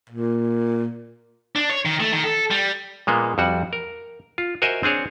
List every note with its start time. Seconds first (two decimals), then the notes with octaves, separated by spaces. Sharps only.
0.10 A#2
1.56 D4
1.70 C#5
1.85 D#3
2.00 A3
2.12 D#3
2.24 A4
2.51 G3
3.07 A#2 G#3 A#3 B3
3.38 F2 G3 F#4 F#5
3.73 A#4
4.38 F4
4.62 F#4 A#4 C5 D#5 E5 G#5
4.83 C4 D4 G#4 C#5